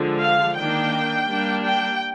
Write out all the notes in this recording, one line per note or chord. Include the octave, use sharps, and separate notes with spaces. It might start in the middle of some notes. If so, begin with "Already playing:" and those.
Already playing: D3 F3 G#3
F5
D#3 A#3 D4 G5
G3 A#3 D4
G5